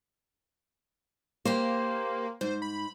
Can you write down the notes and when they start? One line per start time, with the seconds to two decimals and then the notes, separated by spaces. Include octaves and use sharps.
1.45 A#3 G4 A#4 C5
2.41 G#2 C5
2.62 B5